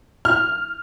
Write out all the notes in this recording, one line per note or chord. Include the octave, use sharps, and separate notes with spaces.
F6